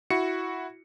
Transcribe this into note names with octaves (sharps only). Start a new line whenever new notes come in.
E4 F#4 C#7